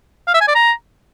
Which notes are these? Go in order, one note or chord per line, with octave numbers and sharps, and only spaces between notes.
F5
E5
G#5
D5
A#5